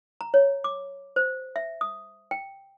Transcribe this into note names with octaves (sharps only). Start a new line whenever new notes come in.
A#5
C#5
D6
C5
E5
D#6
G5